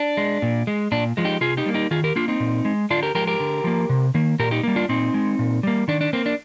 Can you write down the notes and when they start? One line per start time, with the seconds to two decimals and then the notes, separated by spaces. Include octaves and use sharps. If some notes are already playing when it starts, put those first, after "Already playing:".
Already playing: D4
0.17 G#3
0.42 A#2
0.67 G#3
0.92 A#2 D4
1.17 F3 G#3
1.25 D#4 G4
1.41 C3 F4 G#4
1.57 D#4 G4
1.66 G3 A#3
1.74 D#4 G4
1.91 D#3 F4 G#4
2.04 G4 A#4
2.16 A#3 D4 F4
2.28 C4 D#4
2.40 A#2
2.65 G#3
2.90 D3 D4 F4
3.03 G4 A#4
3.15 F3 G#3 G4 A#4
3.27 G4 A#4
3.40 D3
3.64 F3 A#3
3.89 C3
4.14 D#3 A#3
4.39 A#2 G4 A#4
4.51 D#4 G4
4.63 G3 A#3
4.76 D4 F4
4.89 A#2 C4 D#4
5.14 G#3
5.39 A#2
5.63 G3 A#3
5.88 D#3 D4
6.01 D4
6.13 A#3 C4
6.26 D4